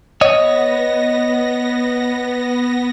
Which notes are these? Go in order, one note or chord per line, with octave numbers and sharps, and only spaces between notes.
B3 C#5 D#5 A#6